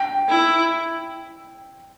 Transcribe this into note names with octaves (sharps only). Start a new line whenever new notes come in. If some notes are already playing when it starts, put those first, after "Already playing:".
Already playing: G5
E4